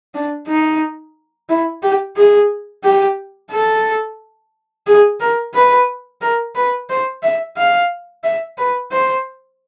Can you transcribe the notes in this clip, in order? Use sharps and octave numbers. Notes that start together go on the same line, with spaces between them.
D4
D#4
E4
G4
G#4
G4
A4
G#4
A#4
B4
A#4
B4
C5
E5
F5
E5
B4
C5